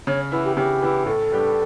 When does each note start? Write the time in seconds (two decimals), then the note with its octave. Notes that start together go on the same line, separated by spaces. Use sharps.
0.07 C#3 C#5
0.32 E3 B3 E4
0.44 G4
0.57 C#3 G4
0.82 E3 B3 E4
1.06 A2 A4
1.31 G3 B3 D4 G4